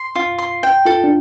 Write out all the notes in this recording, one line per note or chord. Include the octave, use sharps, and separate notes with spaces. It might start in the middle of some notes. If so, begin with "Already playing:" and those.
Already playing: C6
F4
C6
G5
F4 A4
D4